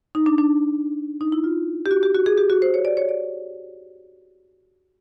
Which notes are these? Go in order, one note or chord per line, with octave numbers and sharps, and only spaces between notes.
D#4
D4
D4
D#4
E4
F4
G4
F#4
G4
F#4
G#4
G4
F#4
C5
C#5
D5
C#5
D5